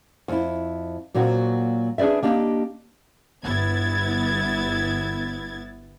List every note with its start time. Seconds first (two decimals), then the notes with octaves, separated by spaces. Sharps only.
0.28 F2 E4
1.14 A#2 F#3 A#3 C4 F#4
1.98 D4 G#4 B4 D5 E5
2.23 A#3 D4 G4 D#5
3.43 G1 B3 E4 G#6 A6